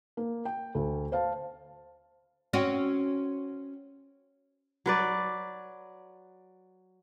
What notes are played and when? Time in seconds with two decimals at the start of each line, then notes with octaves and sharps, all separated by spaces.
0.17 A#3
0.45 G5
0.75 D2 A4
1.12 C5 F5 A5
2.53 C4 C#4 F#4
4.86 F#3 B4 D5